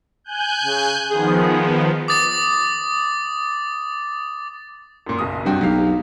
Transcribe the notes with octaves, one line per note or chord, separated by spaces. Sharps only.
G#5 F#6 G6
C#3
D#3 F3 B3 G#4
D6 D#6 A6
F#2 A#2
F#1 B1 D#6
G2 C3 F#4 G5
B1 F#3 G4 F5